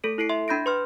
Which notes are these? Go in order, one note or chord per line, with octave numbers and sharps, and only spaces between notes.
A3 A4 D7
E4 A4 C7 D7
E5 C6
D4 B5 G6 A#6 D7
B4 C6 F6